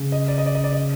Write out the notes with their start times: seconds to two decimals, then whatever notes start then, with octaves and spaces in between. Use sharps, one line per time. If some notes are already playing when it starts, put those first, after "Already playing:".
Already playing: C#3
0.12 D#5
0.28 D5
0.38 D#5
0.46 D5
0.55 D#5
0.64 D5
0.73 D#5